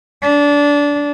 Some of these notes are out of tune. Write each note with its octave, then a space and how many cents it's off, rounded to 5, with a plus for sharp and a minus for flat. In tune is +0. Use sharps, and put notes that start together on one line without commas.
D4 -20